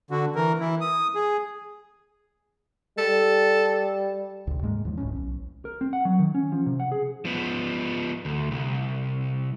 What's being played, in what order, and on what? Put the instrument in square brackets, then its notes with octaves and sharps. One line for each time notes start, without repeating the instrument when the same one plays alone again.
[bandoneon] D3 F#4
E3 A#4
E3 E4
D#6
G#4
[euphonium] G3 [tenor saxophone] A4
[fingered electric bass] D2 C3
G#2 G#3 A#3
D#2 F3
D#1 C#2 A2 C#4
B1
[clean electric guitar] A#4
C4
F#5
F#3
D#3
C#4
F3
C3
F#5
G#4
[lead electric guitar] F3 B3
D2
C2